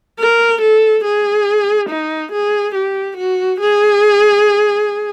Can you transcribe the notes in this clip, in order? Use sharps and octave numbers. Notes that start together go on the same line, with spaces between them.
A#4
A4
G#4
D#4
G#4
G4
F#4
G#4